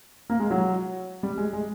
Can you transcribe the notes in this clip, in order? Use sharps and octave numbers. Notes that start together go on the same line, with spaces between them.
A#3
G#3
F#3
G3
G#3
G#3